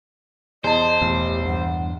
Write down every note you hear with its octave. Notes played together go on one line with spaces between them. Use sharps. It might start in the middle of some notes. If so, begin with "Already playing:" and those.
E2 C5 D#5 A5
E1 E2 A2 G4
E2 G2 F#5